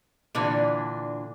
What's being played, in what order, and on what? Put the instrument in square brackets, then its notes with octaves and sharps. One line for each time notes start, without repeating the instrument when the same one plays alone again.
[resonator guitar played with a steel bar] A#2 D3 E3 D4